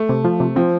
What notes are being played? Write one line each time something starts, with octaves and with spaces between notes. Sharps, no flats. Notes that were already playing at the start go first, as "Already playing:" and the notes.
Already playing: A3
C3
F3
C3
F3 C4